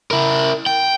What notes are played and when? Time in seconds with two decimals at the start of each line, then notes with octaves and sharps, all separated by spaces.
0.11 E4 A#4
0.67 G5